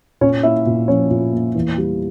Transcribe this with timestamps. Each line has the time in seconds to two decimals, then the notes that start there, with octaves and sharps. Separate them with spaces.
0.21 A#2 C#4 C#5
0.43 A#3 E4 E5
0.66 A#2
0.88 F3 C#4 C#5
1.11 A#2
1.32 A#3
1.55 E2
1.78 G3